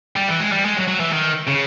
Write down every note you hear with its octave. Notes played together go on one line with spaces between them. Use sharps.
G3
E3
G#3
G3
G#3
F#3
F#3
E3
D#3
C#3